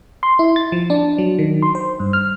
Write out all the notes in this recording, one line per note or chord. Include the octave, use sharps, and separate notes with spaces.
C6
E4
A6
F3
D4
F#3
D#3
C6
C5
G2
F6